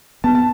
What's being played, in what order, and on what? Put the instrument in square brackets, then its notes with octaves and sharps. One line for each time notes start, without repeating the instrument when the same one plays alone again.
[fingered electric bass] B3 [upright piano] A5
[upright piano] A5